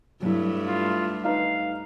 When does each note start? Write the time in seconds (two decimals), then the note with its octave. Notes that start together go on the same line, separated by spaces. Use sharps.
0.22 G2 F#3 A3 E4
0.68 F4
1.25 D#4 B4 F5 G6